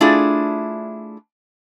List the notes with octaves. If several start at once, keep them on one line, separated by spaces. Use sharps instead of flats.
A3 D4 E4 F4 G#4